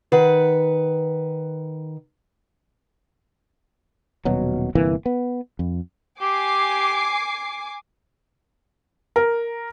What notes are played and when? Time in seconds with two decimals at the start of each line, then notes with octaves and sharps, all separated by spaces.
0.12 D#3 B4 F#5
4.25 D#1 B2 F#3
4.75 G1 C3 E3 A#3
5.06 B3
5.59 F2
6.21 G4 G#5 D6 C7
9.16 A#4